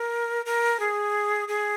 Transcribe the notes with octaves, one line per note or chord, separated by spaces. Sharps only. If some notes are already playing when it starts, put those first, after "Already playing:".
Already playing: A#4
A#4
G#4
G#4